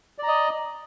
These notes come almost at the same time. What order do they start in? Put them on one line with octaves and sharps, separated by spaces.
D5 A#5 D#5